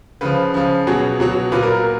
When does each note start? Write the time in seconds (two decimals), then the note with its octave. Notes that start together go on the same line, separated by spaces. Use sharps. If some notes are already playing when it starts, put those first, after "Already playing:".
0.21 C#3 F3 B4
0.54 C#3 F3
0.87 B2 F#3 G#4
1.20 B2 F#3
1.52 A#2 F#3 B4
1.63 A#4
1.74 A#4